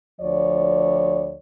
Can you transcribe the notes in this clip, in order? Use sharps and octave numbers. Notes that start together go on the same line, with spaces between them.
D2 F3 C#5 D5